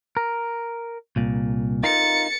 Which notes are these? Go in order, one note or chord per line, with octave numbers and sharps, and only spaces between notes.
A#4
C2 A#2
D#4 F4 A#4 A6 C#7